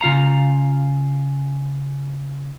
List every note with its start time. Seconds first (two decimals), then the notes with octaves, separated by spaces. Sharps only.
0.01 C#3 F4 F5 A#5